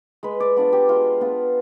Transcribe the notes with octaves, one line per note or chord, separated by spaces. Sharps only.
G#3 B4
D5
B3 D4 F4
G4
G#3 F4
B3 D4 F4